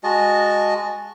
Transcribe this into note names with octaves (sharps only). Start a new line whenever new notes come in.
G#3 F#4 D#5 A5